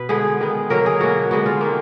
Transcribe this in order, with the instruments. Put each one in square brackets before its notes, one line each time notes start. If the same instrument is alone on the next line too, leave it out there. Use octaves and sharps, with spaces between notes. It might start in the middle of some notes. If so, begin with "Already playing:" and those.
Already playing: [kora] B2 B4
D3 G#3 B3 G#4
D#3 G#3 B3
D3 F#3 A#3 A#4
G#4
B2 A#3 F#4
D3 G#3 B3 F#4
F4
D#3 A#3